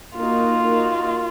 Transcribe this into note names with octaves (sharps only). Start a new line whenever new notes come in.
A#3 D#4 F4 F#4 A#4
A#3 D#4 F#4 A#4